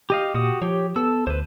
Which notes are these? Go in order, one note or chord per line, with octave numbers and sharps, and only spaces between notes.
G4 D#5 F5
A#2 F#4 G4 D#6
F3 G4 C#5
B3 A4 E6
D2 B4 C5